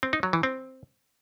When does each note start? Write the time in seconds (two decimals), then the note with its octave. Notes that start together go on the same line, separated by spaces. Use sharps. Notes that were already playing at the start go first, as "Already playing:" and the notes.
0.03 C4
0.13 D#4
0.23 F#3
0.33 E3
0.43 C4